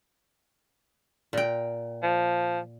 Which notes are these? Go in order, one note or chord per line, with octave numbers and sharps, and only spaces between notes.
A#2 G5
F3